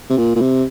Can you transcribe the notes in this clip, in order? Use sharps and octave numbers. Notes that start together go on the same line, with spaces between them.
C3
A#2
A#2
C3